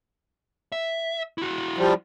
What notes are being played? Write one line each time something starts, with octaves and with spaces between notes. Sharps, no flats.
E5
E4 F#4
F3 G3